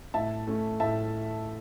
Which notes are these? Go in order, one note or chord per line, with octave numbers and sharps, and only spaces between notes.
A2 E5 A5
A3 C#4
A2 E5 A5